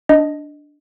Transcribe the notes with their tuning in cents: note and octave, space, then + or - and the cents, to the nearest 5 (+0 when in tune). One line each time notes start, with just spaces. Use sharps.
D4 +0 D#5 +0